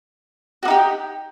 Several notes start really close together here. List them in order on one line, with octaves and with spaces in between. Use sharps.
F#4 A#3 D#4 G4